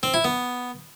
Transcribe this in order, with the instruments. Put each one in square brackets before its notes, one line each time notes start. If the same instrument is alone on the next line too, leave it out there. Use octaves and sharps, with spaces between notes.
[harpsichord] C4
E4
B3